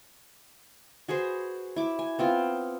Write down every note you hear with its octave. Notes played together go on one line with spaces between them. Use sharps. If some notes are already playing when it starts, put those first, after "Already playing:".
F#4 G#4 B4 C5
E4 D6
G#5
B3 C4 F4